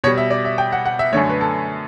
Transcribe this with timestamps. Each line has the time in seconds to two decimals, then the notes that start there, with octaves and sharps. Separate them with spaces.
0.04 B2 C#5
0.07 G3
0.18 E5
0.30 D5
0.45 E5
0.58 G5
0.72 F#5
0.86 F#5
0.99 E5
1.13 F#2 D3 A3 C#5
1.30 B4
1.41 A4